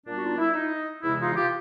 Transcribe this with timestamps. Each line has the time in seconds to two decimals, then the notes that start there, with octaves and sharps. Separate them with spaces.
0.06 A#2 G3 B3 D4
0.15 F#4
0.22 D#4 F4
0.38 E4
0.54 D#4
1.03 E2 C3 E3 G#3 E4
1.19 D#4 F4
1.36 F4 G4